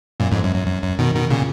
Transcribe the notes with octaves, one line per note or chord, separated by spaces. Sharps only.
F#2 A#2
F2 G#2
F#2
F#2
F#2
F#2
B2 D#3
B2 D#3
A#2 C#3